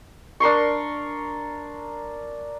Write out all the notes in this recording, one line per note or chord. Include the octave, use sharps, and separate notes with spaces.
D4 A#4 C6 C#6